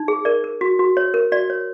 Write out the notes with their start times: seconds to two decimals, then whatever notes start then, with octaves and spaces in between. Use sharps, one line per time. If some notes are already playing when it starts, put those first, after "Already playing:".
Already playing: D#4
0.08 G#4
0.25 A#4 D5
0.44 A#4
0.61 F#4
0.79 F#4
0.97 C#5
1.14 A#4
1.32 F#4 D5
1.50 C#5